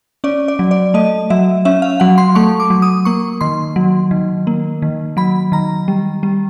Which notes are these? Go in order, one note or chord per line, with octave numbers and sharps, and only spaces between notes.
C#4 D5
D5
F#3
D5
A3 D#5
F#3 E5
C#4 E5
F5
F#3 F#5
C6
A3 C#6
D6
F#3
D#6
A#3 C#6
D#3 C6
F#3
D#3
A#3
D#3
F#3 B5
D#3 A#5
G3
G3